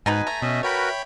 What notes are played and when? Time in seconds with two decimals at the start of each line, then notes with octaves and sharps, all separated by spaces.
0.06 G#2 B2 D#4 B4 G#5
0.27 A3 A#5
0.42 B2 C#4 D#5 E5
0.63 F#4 A#4 B4 C#5 G5 B5